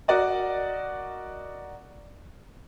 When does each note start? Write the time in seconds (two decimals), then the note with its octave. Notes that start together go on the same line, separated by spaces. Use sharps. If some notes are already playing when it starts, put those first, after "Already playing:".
0.08 F#4 A#4 D5 D#5